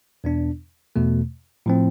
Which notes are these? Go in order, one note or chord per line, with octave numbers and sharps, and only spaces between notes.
E2 B2 B3 D4
E2 B2 A3
A2 F3 C4